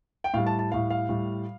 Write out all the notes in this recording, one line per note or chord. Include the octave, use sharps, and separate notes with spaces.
G5
A2 G3 F5
A5
A5
A2 G3 F5
F5
A2 G3